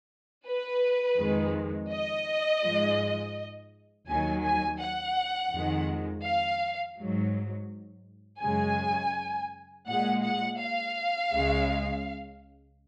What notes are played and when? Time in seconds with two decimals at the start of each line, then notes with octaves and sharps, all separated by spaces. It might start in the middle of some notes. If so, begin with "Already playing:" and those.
0.46 B4
1.18 F2 D#3 G#3
1.91 D#5
2.63 G#2 F3 G#3
4.08 D#2 D#3 F#3 G#5
4.44 G#5
4.80 F#5
5.52 F2 D#3 G#3
6.25 F5
6.98 G#2 F#3
8.42 F#2 C#3 G#3 G#5
9.87 A#2 G#3 F#5
10.23 F#5
10.59 F5
11.31 C#2 C#3 G#3